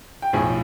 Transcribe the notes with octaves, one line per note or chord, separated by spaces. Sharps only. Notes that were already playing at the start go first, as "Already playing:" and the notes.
G5
B1 A2 F3 G#4 G#5